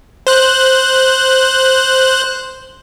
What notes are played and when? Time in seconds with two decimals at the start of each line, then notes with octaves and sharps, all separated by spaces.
0.27 C5 F#6